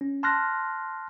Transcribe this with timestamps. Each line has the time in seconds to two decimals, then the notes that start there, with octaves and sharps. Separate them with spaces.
0.01 C#4
0.23 A5 C6 F6 F#6 A#6